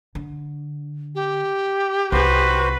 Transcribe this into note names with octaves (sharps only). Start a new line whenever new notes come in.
D3
G4
C2 F4 F#4 B4 C5